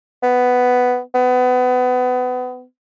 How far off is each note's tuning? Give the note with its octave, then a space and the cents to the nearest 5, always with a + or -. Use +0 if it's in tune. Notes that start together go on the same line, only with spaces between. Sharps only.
B3 +10
B3 +25